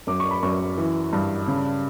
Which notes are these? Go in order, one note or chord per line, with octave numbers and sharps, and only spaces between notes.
F#2 D6
C#6
B5
F#2 C#6
E3
G2
C#3